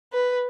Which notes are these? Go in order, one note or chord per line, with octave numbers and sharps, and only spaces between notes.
B4